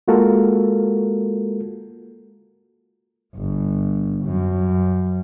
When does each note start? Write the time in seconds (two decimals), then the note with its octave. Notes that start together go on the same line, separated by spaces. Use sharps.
0.08 G#3 A#3 F4 F#4 A4 A#4
3.36 G1
4.25 F#2